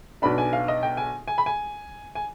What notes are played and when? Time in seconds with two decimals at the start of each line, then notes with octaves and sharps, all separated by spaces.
0.22 B1 B2 B3 D4 B5
0.38 G#5
0.53 F5
0.68 D#5
0.83 G5
0.97 G#5
1.28 G#5
1.38 B5
1.46 G#5
2.15 G#5